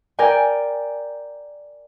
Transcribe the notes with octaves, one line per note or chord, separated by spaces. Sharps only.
A#4 D5 G5 G#5